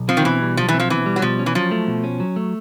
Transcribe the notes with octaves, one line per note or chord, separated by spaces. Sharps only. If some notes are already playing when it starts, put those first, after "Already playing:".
Already playing: B1
F3 C4
D#3
B2 E3
G3
B1 F3
E3
C4
F3
B2 E3
G3
F#3
B2 F3
C#4
E3
F3 F#3
A3
B2
C#4
F#3
A3